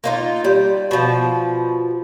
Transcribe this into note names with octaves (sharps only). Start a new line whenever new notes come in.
A#3 D#4 F4
G3
B2 F3